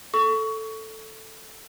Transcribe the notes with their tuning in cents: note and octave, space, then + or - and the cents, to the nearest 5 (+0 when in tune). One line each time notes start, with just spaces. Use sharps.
A4 +0 C#6 +20